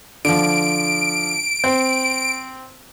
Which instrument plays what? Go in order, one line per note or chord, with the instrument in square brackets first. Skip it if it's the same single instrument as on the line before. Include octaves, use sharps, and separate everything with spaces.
[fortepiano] D3 F3 [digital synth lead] D7
[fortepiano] C4